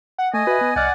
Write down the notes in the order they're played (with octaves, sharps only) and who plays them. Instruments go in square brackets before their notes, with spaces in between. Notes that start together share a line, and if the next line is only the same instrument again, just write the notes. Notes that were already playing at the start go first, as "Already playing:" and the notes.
[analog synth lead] F#5
[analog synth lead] A3 [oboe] D#5 [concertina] G#5
[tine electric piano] F#4 E5 [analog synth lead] B4
[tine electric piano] B3
[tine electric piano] C2 D#5 F6 [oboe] D5 [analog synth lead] F#5